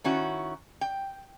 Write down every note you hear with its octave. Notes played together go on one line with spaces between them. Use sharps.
D#3 C#4 E4 F#4
G5